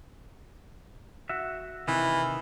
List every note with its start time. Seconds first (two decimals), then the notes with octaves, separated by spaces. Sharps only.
1.29 F#4 E5
1.88 C3 D#3 E3